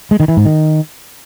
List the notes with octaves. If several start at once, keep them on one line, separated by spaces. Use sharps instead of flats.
G#3
D#3
E3
G#2
D#3